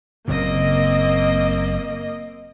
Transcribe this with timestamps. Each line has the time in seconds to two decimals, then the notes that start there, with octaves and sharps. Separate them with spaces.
0.28 F#1 A#2 C#3 A#3 C4 D#5